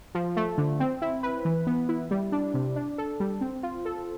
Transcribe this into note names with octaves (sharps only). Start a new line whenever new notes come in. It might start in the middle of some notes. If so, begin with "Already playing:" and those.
F3
A3
D3
C4
E4
B4
E3
B3
E4
G3
D4
C3
D4
A4
G3
C4
F4
A4